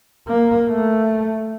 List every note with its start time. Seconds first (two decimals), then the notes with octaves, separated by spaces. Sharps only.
0.28 A#3
0.69 A3